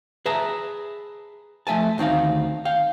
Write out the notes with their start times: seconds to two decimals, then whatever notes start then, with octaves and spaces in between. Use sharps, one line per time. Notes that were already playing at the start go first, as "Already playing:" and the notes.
0.26 G#4 B4 E5 A5 A#5
1.67 F3 A3 E5 G#5 A5
1.98 D2 D#3 C4 D#4 F5
2.65 F5 G5